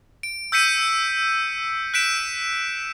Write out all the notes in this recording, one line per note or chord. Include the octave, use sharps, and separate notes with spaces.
D7
E6 G6 B6 C#7 D#7
F#6 B6 D7 E7